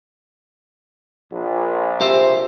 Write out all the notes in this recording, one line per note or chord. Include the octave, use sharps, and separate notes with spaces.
A#1
G4 C5 E5